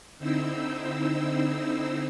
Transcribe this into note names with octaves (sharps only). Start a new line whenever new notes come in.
D3 C4 D#4 E4 C5 E6